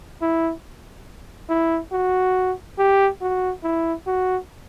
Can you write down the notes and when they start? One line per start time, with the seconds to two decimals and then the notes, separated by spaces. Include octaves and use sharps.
0.22 E4
1.50 E4
1.92 F#4
2.79 G4
3.21 F#4
3.64 E4
4.07 F#4